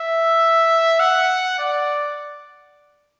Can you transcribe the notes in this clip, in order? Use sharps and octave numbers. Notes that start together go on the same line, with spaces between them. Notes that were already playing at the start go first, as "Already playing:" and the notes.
Already playing: E5
F#5
D5